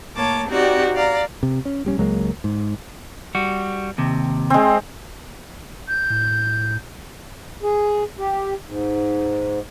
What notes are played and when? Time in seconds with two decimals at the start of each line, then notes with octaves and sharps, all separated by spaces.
0.16 A2 A#3 C#5 A5 D6
0.48 C4 D#4 F#4 G4 D5
0.94 D5 F5 A#5
1.43 C3
1.65 C#4
1.85 A#1 G3 C#4
1.98 C#2 F#3 G#3 A#3
2.44 G#2
3.35 G3 F#4
3.98 D#2 C3
4.50 G#3 C4
5.88 G6
6.10 A2
7.63 G#4
8.18 G4
8.66 G#2